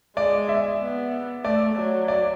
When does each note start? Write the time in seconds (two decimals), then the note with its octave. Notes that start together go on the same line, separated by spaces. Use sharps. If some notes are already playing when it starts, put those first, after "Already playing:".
0.17 G#3 D5
0.49 E5
0.80 B3
1.45 A3 D5
1.76 F#3
2.08 D5